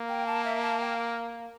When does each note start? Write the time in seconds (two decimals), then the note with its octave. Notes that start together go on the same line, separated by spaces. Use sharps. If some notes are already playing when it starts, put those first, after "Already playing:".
Already playing: A#3
0.09 G5
0.26 A5
0.45 E5
0.62 A5
0.80 G5
0.98 F5